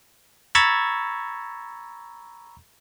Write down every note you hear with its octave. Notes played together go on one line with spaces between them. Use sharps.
A#5 B5 C#6 E6 G#6 A6